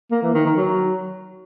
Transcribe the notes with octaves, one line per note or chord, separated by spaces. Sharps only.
A#3
E3
D#3
D#3
F#3